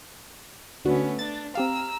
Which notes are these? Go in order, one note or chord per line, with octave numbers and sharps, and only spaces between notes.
D2 A3 B3 C#4 D4 F#4
D4 A6
C4 G4 F5 A#5 E6